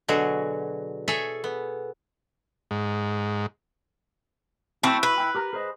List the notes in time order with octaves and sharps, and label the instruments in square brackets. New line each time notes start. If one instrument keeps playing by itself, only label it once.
[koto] B2 D3 F#3 F#4 G#4
G#4 A4 C#5 E5 G#5
B3
[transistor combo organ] G#2
[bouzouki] A3 C4 [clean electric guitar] E4 F#4
[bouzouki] B4
[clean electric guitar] E4 G5
G4 A#4 A#5
G#4 C5 D#5